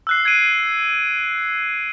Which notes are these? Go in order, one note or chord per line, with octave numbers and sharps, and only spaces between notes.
E6 F#6 C7
G#6 C7 D7 D#7